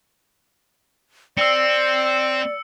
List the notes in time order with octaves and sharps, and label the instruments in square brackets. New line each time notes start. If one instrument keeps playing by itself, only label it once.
[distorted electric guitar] C4 [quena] D5 [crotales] E6 C#7